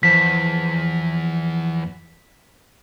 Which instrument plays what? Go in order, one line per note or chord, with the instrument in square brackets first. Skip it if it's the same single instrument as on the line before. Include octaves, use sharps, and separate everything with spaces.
[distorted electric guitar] E2 [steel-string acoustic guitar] F3 A5 [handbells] B6